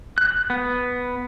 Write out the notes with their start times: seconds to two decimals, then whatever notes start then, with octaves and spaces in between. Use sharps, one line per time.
0.18 F#6
0.50 B3